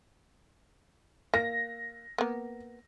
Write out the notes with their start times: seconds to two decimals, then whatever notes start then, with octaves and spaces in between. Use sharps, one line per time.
1.34 A#3 A#6
2.18 A#3 B3